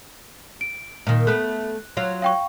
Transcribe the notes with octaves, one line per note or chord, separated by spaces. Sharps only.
D7
A#2 D#3
A3 B3 F#6
F#3 F4
F5 G5 C#6